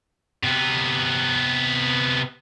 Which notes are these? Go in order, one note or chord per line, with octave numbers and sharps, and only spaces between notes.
C3 B3